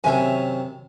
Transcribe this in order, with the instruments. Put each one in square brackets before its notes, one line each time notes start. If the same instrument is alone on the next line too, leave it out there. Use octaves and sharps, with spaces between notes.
[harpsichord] F#2 C3 D#3 [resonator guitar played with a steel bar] C#5 E5 G#5